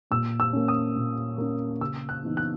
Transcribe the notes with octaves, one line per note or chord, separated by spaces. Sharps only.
A#2 E6
E6
A#3 C#4
D#6
A#2
A#3 C#4
C#3 E6
F#6
E3 B3 D#4
F#6